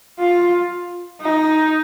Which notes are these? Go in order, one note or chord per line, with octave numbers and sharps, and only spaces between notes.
F4
D#4